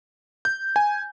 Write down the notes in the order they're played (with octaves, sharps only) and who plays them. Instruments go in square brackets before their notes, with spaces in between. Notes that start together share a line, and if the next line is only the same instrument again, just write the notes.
[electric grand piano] G6
G#5